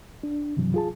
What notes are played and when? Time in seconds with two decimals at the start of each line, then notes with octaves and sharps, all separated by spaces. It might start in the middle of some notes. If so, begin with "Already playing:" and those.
0.23 D4
0.56 G2 C3 E3 F#3
0.74 F4 G#4 A5